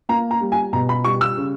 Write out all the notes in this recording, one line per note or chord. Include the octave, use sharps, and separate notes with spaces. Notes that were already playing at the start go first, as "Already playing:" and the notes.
A#3 A#5
A#5
G3
G#5
B2 A#5
B5
G3 C#6
E6
C#3